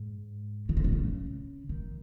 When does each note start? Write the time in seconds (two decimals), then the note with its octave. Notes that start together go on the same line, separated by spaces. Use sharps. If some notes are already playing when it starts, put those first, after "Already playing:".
Already playing: G#2
0.69 D#3
0.77 C#3
0.84 B2
0.92 C#3
1.69 D#3